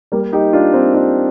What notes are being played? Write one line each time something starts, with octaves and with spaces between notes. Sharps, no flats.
G3 A#3
D#4 G4
D4 F4
C4 D#4
D4 F4